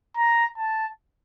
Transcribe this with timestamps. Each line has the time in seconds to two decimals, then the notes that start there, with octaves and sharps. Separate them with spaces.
0.17 A#5
0.58 A5